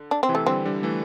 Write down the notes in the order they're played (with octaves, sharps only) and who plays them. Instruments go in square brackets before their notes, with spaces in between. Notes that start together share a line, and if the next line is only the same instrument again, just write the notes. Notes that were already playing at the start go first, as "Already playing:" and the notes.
Already playing: [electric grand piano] D3
[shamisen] D4
C4
[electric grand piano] C3 E3
[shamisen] A3
[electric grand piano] D3 G3 [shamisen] C4
[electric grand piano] D3 G3
E3 A3